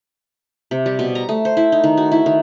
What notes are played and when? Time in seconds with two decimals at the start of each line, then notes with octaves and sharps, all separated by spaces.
0.71 C3
0.86 G3
0.99 B2
1.15 A#5
1.29 A3
1.45 C5
1.57 E4
1.72 D#4
1.84 D#3
1.97 F#4
2.11 E4
2.26 D#3